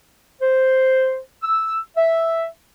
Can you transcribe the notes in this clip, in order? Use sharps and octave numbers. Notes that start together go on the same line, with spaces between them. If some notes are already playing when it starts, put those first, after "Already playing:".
C5
E6
E5